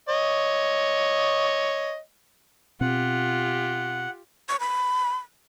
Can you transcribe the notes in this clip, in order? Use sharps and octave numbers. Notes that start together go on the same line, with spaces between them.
C#5 D#5
B2 C4 F4 G4 F#5
C#6
B5